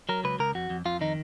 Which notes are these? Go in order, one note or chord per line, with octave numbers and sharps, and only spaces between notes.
F#3 A#4
C#2 B4
C#2 A#4
F2 F#4
F2
F2 F4
D#3 D#4